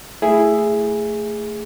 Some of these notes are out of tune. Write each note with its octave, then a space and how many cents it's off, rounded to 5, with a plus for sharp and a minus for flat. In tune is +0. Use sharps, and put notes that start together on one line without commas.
A3 +10 E4 +5 G#4 +0